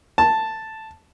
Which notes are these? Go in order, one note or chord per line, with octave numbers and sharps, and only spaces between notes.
A5